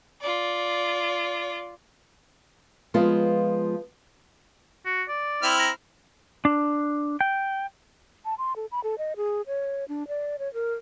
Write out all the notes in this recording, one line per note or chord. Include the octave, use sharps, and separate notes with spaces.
F4 D5
F3 G#3 B3 F4
F#4
D5
C4 E4 F6
A#5
D4
G5
A5
C6
A4
B5
A4
D#5
G#4
C#5
D4
D5
C#5
A#4